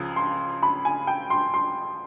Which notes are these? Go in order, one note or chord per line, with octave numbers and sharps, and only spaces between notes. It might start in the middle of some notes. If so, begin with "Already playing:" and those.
Already playing: C#2 C#3 F3
C6
B5
G#5
G5
C6
C6